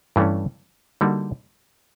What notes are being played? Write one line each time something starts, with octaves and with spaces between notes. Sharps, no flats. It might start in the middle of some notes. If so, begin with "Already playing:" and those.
G2 E3 A3 C#4
D3 G3 A#3 D#4 F#4